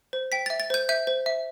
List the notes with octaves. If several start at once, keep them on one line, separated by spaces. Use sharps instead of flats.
C5
G5 B6
E5 A6
A6
C5 G6
E5 G6
C5
E5